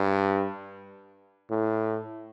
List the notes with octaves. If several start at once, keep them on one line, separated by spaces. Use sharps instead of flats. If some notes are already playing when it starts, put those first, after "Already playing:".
Already playing: G2
A2